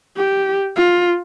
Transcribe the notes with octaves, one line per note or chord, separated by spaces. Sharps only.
G4
F4